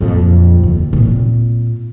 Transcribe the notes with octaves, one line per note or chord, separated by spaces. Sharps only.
F2 A#2
D#2 D3
A#2 C4